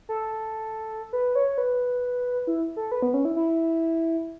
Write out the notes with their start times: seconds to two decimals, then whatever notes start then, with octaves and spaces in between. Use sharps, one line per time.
0.09 A4
1.13 B4
1.35 C#5
1.58 B4
2.47 E4
2.77 A4
2.92 B4
3.02 B3
3.14 C#4
3.25 E4
3.36 E4